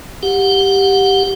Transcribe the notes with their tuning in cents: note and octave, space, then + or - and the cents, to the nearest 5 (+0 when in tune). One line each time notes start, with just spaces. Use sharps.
G4 +0 F#5 -15